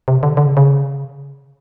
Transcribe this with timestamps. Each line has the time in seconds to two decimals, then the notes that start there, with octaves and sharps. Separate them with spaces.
0.08 C3
0.23 D3
0.37 D3
0.46 C#3
0.57 C#3